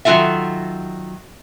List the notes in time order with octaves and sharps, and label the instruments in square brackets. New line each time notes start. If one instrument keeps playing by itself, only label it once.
[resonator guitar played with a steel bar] D#3 F#3 C#4 F4 A4 E5